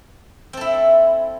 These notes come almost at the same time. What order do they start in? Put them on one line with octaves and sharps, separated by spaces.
C4 A4 E4